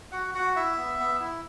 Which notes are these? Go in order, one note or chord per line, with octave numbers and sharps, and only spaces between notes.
F#4 F#5
F#4 F#5
E4 E5
B3
B3
E4